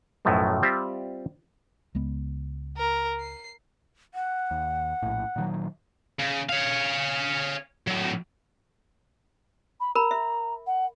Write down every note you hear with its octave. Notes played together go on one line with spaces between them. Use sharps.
B1 F#2 A2 F3 F#3 A3
G3 C4 F4 G4 D5 E5
C#2 G#3 B3
A#4
C7
F#5
D#2
A#1 A2
A#2 D#3 F#3
C#3
C#5 F5
A2 F#3
B5
A#4 A#5 B5
E5
F#5